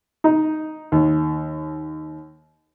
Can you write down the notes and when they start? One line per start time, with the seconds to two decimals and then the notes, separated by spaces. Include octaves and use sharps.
0.24 D#4
0.92 D#2